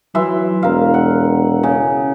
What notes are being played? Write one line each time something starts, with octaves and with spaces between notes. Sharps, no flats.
E3 F#3 E5 C6
E1 A#4 F5
F#5
C#3 G#5